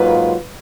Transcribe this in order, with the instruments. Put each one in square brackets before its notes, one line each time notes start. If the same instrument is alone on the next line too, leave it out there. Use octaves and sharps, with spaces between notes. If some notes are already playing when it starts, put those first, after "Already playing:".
Already playing: [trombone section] G#2 F#3 A#3 F4 [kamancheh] B4